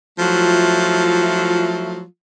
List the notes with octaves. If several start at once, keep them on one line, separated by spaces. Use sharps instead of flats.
F3 F#3 A3 E4 F4